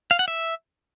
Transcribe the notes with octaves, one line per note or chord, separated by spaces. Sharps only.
F5
F#5
E5